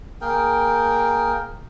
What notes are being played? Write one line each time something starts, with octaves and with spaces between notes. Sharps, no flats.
A#3 G#4 A#4 G5